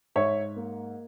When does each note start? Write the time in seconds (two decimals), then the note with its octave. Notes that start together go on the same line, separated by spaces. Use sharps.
0.16 G#2 C#5 E5
0.56 A#3